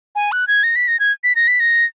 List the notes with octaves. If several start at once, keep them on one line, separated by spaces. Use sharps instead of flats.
G#5
F#6
G#6
A#6
B6
A#6
G#6
B6
A#6
B6
A#6